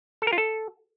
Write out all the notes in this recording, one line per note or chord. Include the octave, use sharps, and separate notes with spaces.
A4
A#4
F4
A4